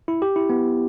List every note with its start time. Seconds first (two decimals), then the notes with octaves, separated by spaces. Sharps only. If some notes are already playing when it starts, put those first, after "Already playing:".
0.08 E4
0.22 G4
0.36 E4
0.50 B3